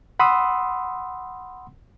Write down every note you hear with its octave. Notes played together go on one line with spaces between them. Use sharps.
F#5 B5 C6 D#6 E6